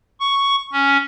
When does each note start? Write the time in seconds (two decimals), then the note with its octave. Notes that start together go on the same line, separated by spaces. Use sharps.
0.20 C#6
0.73 C#4